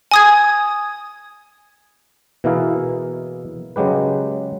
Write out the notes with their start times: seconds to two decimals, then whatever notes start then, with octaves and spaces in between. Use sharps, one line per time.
0.11 G#5 D#6 G#6
2.44 B2 E3 A#3 E4 G#4 F5
3.76 C#3 F#3 G#3 G4 B4